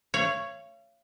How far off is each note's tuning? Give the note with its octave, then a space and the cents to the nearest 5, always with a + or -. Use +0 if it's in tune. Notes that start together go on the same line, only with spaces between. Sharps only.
C#5 +0 F5 -40